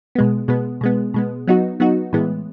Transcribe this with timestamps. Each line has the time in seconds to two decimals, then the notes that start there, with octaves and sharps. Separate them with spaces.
0.15 B2 G#3 B3
0.48 B2 G#3 B3
0.81 B2 G#3 B3
1.14 B2 G#3 B3
1.47 F#3 B3 D#4 F#4
1.80 F#3 B3 D#4 F#4
2.13 A2 E3 G#3 B3